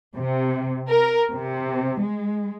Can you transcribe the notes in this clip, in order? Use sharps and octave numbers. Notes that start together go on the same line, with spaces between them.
C3
A#4
C3
G#3